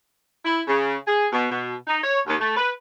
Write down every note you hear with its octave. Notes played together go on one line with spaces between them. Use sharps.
E4
C#3
G#4
B2
B2
D#4
C#5
D#2
A3
B4